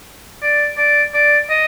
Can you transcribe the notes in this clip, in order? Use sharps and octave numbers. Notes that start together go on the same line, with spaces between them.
D5
D5
D5
D#5